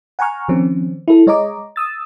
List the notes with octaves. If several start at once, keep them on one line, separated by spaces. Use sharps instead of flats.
F#5 G#5 A#5 C#6 F6
D#3 F3 C4 C#4
E4 A4
G#3 C#5 D#5 A#5 D6
D#6 E6 A6